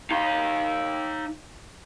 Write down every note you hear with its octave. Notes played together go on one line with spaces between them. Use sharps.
D#4 F5